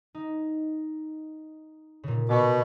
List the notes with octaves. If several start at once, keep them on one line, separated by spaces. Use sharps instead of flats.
D#4
A#2 C#3
B2 B5 C#6 D6